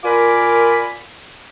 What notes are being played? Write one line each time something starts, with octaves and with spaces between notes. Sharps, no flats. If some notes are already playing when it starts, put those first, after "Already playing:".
A#2 F4 A#4 G#5 B5 D6